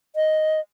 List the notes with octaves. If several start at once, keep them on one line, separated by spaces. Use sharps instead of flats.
D#5